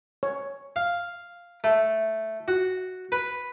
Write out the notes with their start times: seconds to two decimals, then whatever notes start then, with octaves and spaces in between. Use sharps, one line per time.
0.23 C#5
0.76 F5
1.64 A3
2.48 F#4
3.12 B4